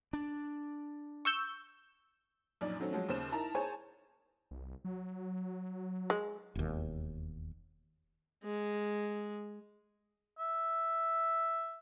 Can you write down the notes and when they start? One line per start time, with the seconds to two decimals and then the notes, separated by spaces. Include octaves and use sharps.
0.13 D4
1.25 C#6 E6 G6
2.61 A#1 F#2 D#4 D5
2.80 D#3 F#3 A3 C4 C#4
2.93 F3 F#3 G#3
3.09 D#2 C#3 C5 E7
3.32 D#4 E4 A#4 A5 A#5
3.55 G#4 C5 C#5 G#5 A5
4.51 C2
4.85 F#3
6.10 G#3
6.55 E1 D#2
8.44 G#3
10.38 E5